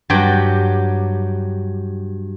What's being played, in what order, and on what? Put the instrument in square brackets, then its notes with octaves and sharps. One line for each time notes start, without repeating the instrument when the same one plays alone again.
[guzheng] G2 F#3 G4 G5